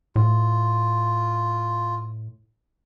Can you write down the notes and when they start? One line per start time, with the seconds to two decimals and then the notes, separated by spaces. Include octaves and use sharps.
0.16 A2 F4